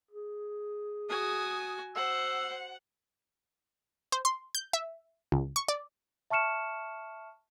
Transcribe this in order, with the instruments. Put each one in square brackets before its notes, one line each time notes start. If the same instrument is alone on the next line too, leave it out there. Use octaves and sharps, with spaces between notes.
[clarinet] G#4
[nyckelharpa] F#4 G#5 [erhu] D#6
[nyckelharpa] C5 [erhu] F#5 [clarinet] E6
[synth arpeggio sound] C5
C6
G6
E5
C#2
C#6
D5
[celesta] E5 A5 C#6 F6 C#7 E7